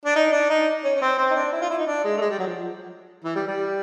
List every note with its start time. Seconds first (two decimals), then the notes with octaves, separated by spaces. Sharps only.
0.05 D4
0.15 D#4
0.32 D4
0.50 D#4
0.84 C#4
0.96 C#4
1.01 C4
1.18 C4
1.31 D#4
1.36 D4
1.52 E4
1.62 F4
1.70 E4
1.78 D#4
1.87 D4
2.05 G#3
2.17 A3
2.21 G#3
2.30 G3
2.39 F#3
2.46 F3
3.24 E3
3.35 G3
3.48 G3